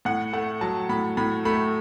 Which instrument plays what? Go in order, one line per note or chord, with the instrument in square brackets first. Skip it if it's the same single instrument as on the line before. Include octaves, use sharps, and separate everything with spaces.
[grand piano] A2 F#5
A3 F#5
F#3 A5
A2 B5
A2 B5
A3 B5